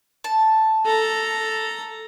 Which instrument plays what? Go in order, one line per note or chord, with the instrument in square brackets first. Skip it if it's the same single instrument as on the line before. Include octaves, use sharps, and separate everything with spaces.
[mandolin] A5
[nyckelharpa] A4 A#5